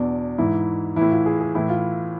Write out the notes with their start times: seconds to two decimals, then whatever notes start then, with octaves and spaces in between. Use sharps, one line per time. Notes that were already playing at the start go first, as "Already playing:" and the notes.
Already playing: E2 B2 D4
0.38 G#2 E3 E4
0.96 A2 E3 E4
1.11 F4
1.26 G#4
1.40 G#4
1.55 A2 E3 E4
1.69 F4